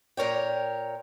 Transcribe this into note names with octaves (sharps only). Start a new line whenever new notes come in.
A#2 A#4 C#5 G5